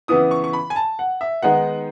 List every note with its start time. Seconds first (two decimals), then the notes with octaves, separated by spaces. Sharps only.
0.08 C#3 E3 B3 E4 D#6
0.31 C#6
0.44 C#6
0.53 B5
0.70 G#5
0.76 A5
0.99 F#5
1.21 E5
1.42 D#3 G#3 B3 D#4 F#5